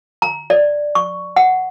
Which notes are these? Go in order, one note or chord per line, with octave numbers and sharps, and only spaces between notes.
A#5
D5
C#6
F#5